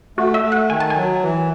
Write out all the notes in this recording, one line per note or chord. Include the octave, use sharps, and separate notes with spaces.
A3 F#4
E5
A3
F#5
D#3 G#5
A5
G#5
F#3
E3